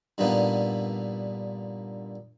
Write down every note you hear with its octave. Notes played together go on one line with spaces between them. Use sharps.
G2 A#2 D3 A#3 B3 D#4